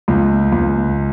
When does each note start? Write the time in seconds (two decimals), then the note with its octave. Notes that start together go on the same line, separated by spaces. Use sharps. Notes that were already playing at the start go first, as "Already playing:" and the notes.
0.08 C#2
0.52 C#2